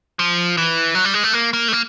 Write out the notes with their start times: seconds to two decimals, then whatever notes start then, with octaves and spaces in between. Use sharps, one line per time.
0.19 F3
0.57 E3
0.95 F#3
1.05 G3
1.14 G#3
1.24 A3
1.33 A#3
1.53 A#3
1.68 A3
1.73 A#3